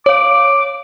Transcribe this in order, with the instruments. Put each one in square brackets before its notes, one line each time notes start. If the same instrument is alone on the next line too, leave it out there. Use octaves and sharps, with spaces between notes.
[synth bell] C#5 F5 [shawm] D6